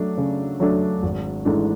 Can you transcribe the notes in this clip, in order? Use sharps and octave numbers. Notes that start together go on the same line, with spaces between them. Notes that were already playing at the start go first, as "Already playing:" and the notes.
Already playing: F#3 A3 D4
C#3
F#3 A3 D4
G#1
G#2 E3 A3 D4